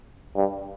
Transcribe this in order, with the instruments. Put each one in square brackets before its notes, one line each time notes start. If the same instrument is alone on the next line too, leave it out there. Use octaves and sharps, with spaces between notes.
[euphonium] G2